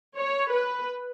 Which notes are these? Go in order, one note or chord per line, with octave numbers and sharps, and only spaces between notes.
C#5
B4